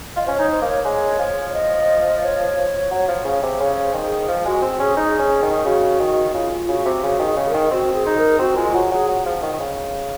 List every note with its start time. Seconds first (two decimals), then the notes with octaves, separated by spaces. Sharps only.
0.16 F4 D#5
0.26 C#4 C5
0.34 C#5
0.39 D#4
0.51 C5
0.62 A#3
0.67 C#5
0.85 G#3 C#5
1.19 F3
1.50 C#5
1.53 D#5
2.22 C#5
2.91 F#3
3.08 F3
3.25 C#3
3.43 C3
3.59 C#3 C#5
3.82 C5
3.94 D#3
4.06 G#4
4.28 F3
4.45 G#3 F#4
4.62 C4
4.79 C#4 G#4
4.97 D#4 G#4
5.19 C#4
5.43 D#3
5.60 G#4
5.65 C#3 F#4
6.00 D#3
6.34 C#3 F4
6.68 C#3 F#4
6.85 C3
7.03 C#3 F#4
7.19 D#3
7.26 G#4
7.37 C#3
7.48 A#4
7.54 D#3
7.71 C4 F#4
7.94 G#4
8.06 D#4
8.17 A#4
8.39 C4 F#4
8.57 G#3 F4
8.74 F#3 F#4
8.91 F#3 G#4
9.08 F#3
9.26 F3
9.43 D#3
9.54 D#3
9.60 C#3